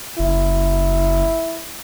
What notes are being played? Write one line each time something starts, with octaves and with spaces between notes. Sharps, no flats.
F#1 E4